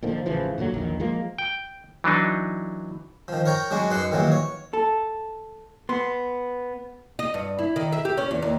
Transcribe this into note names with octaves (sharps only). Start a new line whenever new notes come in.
A#2 D3 D#3 F3
A1 C#3 E3 F3
A#2 D3 D#3 F#3
A#1 E2 D#3
F3 G#3 A#3
G5
E3 F#3 D4 D#4
D#3 F3
A#4 C#5 G5 A#5
F#3 G#3 D4 F#4
F#2 D#4 B4 F#5 C6
A#1 D#3 E3 F#3 A#3
C#5
A4
B3 C6
D#5
G2
E4
D#3
E5
G4
C#4
E2
D#2